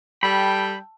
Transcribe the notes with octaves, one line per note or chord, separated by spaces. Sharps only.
G3 A4 G5 B5